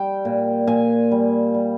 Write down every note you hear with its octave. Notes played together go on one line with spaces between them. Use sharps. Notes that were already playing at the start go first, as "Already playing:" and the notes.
Already playing: G3 G5
A#2
A#2 G#5
G3
G3